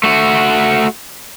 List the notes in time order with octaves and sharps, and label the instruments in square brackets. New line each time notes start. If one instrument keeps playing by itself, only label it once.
[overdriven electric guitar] A3 F#4